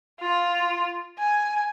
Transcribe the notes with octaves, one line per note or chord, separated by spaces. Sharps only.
F4
G#5